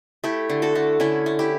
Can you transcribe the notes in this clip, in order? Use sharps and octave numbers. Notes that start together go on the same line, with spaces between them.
A3 E4 G4
D3
F#4 A4
A3
D3 C#4 E4
A3
E4 G4